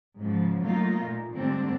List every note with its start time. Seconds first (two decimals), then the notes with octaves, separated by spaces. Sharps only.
0.18 G#2 C#3 F3
0.63 F#3 A3 A#3 D#4 F4
1.01 A#2
1.33 G#2 D3 G3 A3 C4 D4